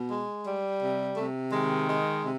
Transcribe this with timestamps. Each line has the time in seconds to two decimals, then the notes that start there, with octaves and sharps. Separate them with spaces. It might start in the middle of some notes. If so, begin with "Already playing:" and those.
Already playing: B2
0.09 G#3
0.45 G3
0.80 C3
1.16 C3 A3
1.51 D#3 G#3
1.88 G#3
2.23 C3